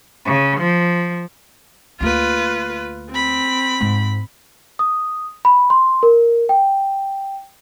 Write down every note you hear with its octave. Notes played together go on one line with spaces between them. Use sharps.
C#3
F3
D2 A#3 F4 B4
C4 B5
G#2
D#6
B5
C6
A#4
G5